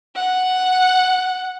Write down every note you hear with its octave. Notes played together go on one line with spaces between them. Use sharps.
F#5